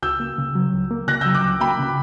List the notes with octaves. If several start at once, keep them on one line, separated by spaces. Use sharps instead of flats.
C#2 E6 G6
A#3
C#3
F#3
C#2
A#3
C#3 F#6 A#6
F#3 E6 G6
D6 F#6
C#2
A#3 G5 B5
C#3